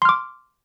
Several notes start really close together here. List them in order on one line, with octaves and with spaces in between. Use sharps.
C6 F6 D6